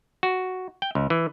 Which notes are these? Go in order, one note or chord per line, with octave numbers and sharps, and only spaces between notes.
F#4
G5
C#2
E3